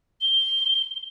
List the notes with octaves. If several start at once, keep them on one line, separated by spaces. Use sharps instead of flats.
G7